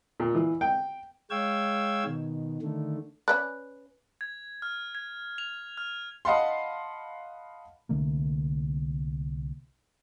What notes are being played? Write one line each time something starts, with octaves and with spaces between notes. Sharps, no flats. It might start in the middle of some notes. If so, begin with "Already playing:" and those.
A#2
E3
G5
G#3 C#5 F5 G5 E6 G#6
B2 D#3
D3 D#3 A3
C#4 B4 D5 F#6
G#6
F6
G#6
F7
F6
D#5 F5 F#5 A5 B5 C6
C2 D3 A3 A#3